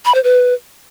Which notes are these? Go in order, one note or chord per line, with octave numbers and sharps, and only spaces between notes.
B5
C5
B4